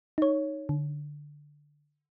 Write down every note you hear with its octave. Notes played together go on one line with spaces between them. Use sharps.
D#4 C#5
D3